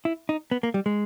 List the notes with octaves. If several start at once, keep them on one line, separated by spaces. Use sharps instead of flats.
E4
D#4
B3
A#3
G3
G#3